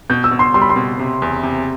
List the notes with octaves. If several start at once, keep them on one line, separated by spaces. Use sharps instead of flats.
B2 G6
E6
B2
C6
G3 C6
B5
C6
B2
C3
E2
C3